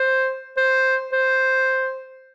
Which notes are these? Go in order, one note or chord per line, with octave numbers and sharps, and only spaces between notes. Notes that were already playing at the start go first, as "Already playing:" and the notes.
Already playing: C5
C5
C5